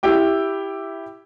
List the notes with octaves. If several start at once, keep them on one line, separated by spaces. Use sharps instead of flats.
E4 G4 G5 D6